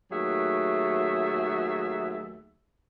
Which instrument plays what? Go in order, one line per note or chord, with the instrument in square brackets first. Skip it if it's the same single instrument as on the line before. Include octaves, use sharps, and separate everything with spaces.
[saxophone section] D#2 F#3 A3 G#4 E5